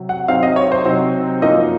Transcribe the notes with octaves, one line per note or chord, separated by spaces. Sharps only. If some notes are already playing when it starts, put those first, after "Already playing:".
Already playing: C3 F#3
F#5
C3 F#3 C4 D#4 F5
D#5
C#5
C5
C3 F#3 C4 D#4
F#2 F3 A#3 D#4 D#5